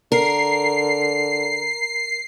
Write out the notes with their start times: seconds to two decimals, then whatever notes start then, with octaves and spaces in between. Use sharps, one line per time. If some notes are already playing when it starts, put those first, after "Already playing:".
0.12 D3 A#4 C7